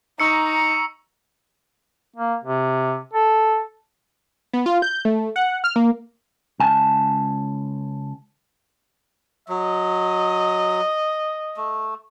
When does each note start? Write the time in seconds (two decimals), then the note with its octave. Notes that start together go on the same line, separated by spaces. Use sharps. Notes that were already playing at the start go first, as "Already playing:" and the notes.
0.20 D#4 A#5 C#6 E6 C#7
2.16 A#3
2.44 C3
3.13 A4
4.53 B3
4.66 F4
4.82 G6
5.05 A3
5.36 F#5
5.64 F6
5.76 A#3
6.60 C#2 G#5 A5
9.49 F#3 D#5
11.57 A3